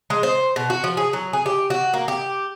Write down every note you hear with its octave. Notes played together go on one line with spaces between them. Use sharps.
G#3
C5
B2
F#4
F3
G#4
F#3
G#4
G4
F#4
A#3
G4